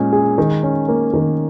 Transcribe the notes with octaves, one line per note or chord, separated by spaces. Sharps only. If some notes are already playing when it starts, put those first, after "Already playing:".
Already playing: A#2 G#3 C#4
G#4
D#3
C#4
A#3
D#3